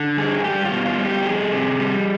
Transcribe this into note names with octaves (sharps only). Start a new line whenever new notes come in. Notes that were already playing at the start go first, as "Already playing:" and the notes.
Already playing: D3
G2 G#4
G3 G4
F4
B2
F4
G3
G4
F2 G#4
C3
G3